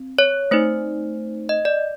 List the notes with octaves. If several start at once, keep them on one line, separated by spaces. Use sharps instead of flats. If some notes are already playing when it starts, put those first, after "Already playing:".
Already playing: C4
C#5
A3 C4 D#4 C5
D#5
D5